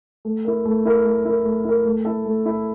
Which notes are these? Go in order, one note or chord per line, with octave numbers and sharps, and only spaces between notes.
A3
E4 A#4
A3
E4 A#4
A3
E4 A#4
A3
E4 A#4
A3
E4 A4
A3
E4 A4